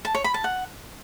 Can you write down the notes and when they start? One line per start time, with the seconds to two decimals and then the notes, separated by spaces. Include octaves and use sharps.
0.05 A5
0.15 C#5
0.24 B5
0.34 A5
0.44 F#5